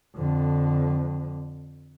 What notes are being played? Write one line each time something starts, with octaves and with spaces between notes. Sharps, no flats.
F2 D3